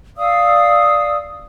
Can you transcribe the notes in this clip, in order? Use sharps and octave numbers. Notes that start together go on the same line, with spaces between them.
D5 F5 D#6 E6